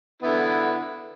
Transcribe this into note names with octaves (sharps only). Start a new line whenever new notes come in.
D3 B3 E4